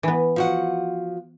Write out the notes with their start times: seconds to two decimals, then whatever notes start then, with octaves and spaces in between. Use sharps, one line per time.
0.03 E3 B3
0.36 F3 F#4 F#5